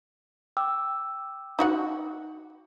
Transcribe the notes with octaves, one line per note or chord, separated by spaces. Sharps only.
G5 D6 E6
D#4 F#4 F#5